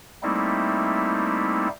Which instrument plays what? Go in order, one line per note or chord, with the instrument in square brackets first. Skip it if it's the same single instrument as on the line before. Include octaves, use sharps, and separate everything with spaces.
[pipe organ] G3 A3 A#3 C4 D#4 E4